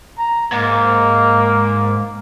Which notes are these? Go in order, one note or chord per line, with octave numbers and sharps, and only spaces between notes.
A#5
G#2 A#3